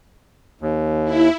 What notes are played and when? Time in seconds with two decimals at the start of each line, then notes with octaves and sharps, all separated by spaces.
0.61 D#2
1.04 E4